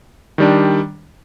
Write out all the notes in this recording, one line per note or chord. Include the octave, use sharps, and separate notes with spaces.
D#3 G3 D4